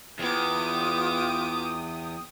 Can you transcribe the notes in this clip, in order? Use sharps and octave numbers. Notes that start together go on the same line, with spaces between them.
E2 B3 F4 G5 D6 D#6